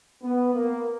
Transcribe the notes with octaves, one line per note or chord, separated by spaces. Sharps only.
B3
A#3